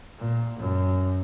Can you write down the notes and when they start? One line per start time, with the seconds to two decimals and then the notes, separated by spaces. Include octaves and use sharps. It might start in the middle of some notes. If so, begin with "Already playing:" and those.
0.18 A#2
0.59 F#2